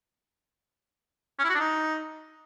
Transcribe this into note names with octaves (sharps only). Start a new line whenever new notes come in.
C#4
E4
F#4
D4
D#4